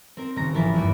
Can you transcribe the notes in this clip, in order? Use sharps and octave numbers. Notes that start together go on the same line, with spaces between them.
C4 A#4
D#1 C#3 A#5 A#6
G#1 E3 F3 A#4 A5 B5
E2 G2 A#3